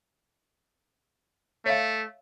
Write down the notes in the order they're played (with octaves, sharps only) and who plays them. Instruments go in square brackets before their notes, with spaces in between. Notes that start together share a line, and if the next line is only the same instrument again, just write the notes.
[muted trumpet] A3 [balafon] C#5 E5 F5